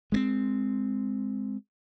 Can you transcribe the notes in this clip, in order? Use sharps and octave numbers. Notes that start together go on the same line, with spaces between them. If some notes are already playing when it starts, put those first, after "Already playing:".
G#3 A#3 C4